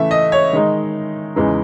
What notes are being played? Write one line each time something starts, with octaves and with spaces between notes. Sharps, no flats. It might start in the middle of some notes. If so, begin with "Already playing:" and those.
Already playing: C#3 E3 A3 E5
D#5
C#5
D#3 G#3 D#4
E2 C#3 E3 G#3 D#4